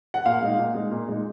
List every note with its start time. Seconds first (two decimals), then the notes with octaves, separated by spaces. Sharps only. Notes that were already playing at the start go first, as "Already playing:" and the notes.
0.14 F#5
0.25 A#2 F5
0.42 G#3 D#4
0.58 A#2
0.74 G#3 D#4
0.91 A#2
1.08 G#3 D#4